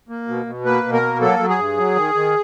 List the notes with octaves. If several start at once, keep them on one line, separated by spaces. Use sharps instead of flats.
A#3
B2
B2
A#3 B4
B2
A#4
A#3
F#3 A4
F#3
G#4
G2
F#3
D#3
D#3